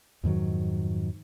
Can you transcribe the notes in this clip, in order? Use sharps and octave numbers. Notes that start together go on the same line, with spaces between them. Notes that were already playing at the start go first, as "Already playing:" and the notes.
F2 G#2 D#3 F#3